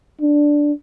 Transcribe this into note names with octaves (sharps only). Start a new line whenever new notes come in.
D4